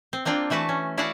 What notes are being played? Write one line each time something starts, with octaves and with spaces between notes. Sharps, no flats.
C4
A#3 C4 D4 F4 D5 G5
E3 A3 F#4 B4 A5
C#4
E4 F#4 D5 F5 F#5 A5